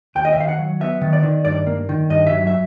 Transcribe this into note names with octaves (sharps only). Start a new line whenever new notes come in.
D#2 G5
D#5
E5
D#3 F5
F#5
F#3
B3 E5
D#3
D5
D#3
G2 D5
A#3
D#3
G2 D#5
E5
F#3
E5